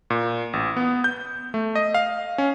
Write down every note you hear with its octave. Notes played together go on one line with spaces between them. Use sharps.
A#2
A1
B3
G6
A3
D#5
F5
C#4